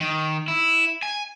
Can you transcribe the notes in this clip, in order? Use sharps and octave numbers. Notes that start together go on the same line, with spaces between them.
D#3
E4
G#5